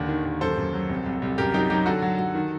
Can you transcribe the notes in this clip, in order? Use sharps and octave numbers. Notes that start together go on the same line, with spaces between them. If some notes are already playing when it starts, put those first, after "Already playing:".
Already playing: D#2 D3
D#3
D#2
F#2 A4 C5
F#2
F#3
C2
C2
C2
F#2 G4 A#4
F#3 D#4 G4
F#3 D#4 G4
D3 F#4 A4
F#3
F#3
D#3